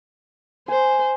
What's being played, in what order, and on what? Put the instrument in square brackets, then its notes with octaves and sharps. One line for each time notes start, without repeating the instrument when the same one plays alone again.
[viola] C5 [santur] G#5